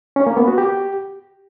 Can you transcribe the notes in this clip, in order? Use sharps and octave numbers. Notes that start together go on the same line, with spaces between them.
C#4
A#3
B3
F#4
G4